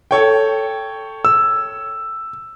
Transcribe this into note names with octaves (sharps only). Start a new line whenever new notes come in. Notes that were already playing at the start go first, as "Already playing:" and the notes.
A4 C#5 G5
E6